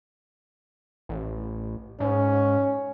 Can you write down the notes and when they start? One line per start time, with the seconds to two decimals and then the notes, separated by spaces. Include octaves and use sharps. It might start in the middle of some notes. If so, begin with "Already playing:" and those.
1.09 A1
2.00 G#2 C#4